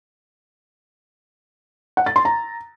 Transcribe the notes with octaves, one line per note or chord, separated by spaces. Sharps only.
F#5
A6
C6
A#5